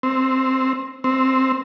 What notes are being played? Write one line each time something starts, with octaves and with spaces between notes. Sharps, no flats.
C4
C4